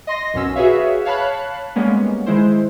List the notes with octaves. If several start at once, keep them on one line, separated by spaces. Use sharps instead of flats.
D#5 C6 A#6
B1 F#2 B2 C#4 E6
F#4 G#4 B4 C#5 E5 F5
C#5 F5 A5 B5 F#6
G3 G#3 A#3 B3 C#4
D#3 G#3 E4 C5